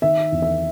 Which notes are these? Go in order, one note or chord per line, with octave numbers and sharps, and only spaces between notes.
D#3 E5
E2
E5